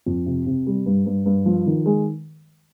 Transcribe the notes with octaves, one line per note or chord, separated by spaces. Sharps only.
F2
C3
C3
G3
G2
G2
G2
F3
D#3
G#3